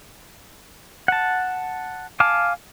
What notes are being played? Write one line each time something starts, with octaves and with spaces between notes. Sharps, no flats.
F#5 A5
F5 G#5 A5 D6 F6